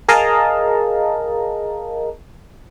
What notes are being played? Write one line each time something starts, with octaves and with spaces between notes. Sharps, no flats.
G#4 A#4 D#5 F5 A5 A#5